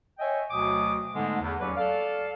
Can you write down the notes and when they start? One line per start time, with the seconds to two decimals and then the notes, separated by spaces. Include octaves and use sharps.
0.19 C#5 D#5 E5 G5 G#5
0.51 D2 B2 F#3 D6 D#6
1.15 G#2 D3 G#3 A3 B3
1.40 E2
1.60 D#2 F#3 C#4 B4 D5
1.76 A4 D5 F5